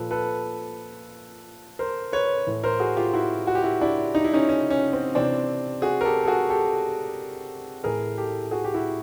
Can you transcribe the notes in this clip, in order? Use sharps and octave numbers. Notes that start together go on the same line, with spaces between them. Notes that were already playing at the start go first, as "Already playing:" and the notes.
Already playing: A#2 F3 A4 B4
A4 B4
A#4 C5
B4 C#5
A2 E3
A#4 C5
F#4 G#4
F4 G4
E4 F#4
F#4
G4
E4 F#4
D4 E4
D#4
E4
C#4 D#4
C#4
C#4
C4
C3 E3 C4 D4
F#4 G#4
A#4
G4 A4
A4
F#4 G#4
G4 A4
A2 E3 G#4 A#4
G4 A4
F#4 G#4
G4
E4 F#4